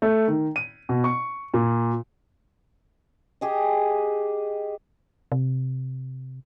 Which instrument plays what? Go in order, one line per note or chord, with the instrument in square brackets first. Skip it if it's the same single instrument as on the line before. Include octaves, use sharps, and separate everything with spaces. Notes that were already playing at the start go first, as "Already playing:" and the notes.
[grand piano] A3
D#3
D#7
B2
C#6
A#2
[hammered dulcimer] G4 G#4 D#5
[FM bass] C3